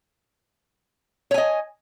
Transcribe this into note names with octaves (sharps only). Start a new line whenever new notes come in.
C#5 D#5 G#5